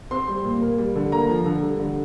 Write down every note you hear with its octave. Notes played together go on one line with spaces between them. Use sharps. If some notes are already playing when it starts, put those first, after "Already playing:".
C4 C6
G3
A#2
A#3
G3
D3
A#3 A#5
F3
D3
G3
D3